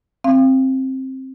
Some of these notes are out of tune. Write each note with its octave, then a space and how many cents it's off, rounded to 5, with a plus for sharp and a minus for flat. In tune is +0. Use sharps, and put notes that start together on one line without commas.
C4 +15 F5 -20